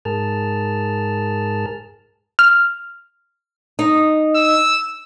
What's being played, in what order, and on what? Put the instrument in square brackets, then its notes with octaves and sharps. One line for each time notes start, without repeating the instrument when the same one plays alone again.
[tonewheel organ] G#2 G#4 A#4 A5 F6
[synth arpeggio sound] F6
[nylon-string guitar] D#4
[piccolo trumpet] E6